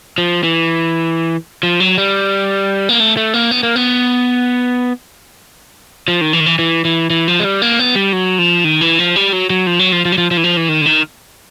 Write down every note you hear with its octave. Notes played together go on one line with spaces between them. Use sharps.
F3
E3
F3
F#3
G3
A#3
A3
A3
A#3
B3
A#3
B3
F3
D#3
E3
D#3
E3
E3
E3
E3
F3
G#3
G3
A#3
B3
G3
F#3
F3
D#3
E3
F3
G3
F#3
F#3
F3
F#3
F3
F3
F#3
F3
F3
E3
F3
E3
D#3
D3
D#3